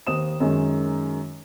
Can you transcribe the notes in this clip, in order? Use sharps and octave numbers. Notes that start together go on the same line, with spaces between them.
D#2 C5 D#6 E7
F#2 D#3 G#3